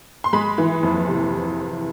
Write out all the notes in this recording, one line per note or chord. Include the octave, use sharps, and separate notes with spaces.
C6
G#3 B5
E3
F2
C3